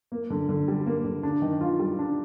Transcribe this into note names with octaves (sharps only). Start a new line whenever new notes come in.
A#3
D3
D3
G3
A#3
D3
D4
D#3
F4
G3
D4